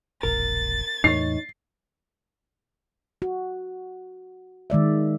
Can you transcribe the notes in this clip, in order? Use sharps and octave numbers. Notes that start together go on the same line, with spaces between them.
E1 A#1 A#4 A6
E2 A2 D#4 C#5 C7
F#4
D#3 G#3 D5 E5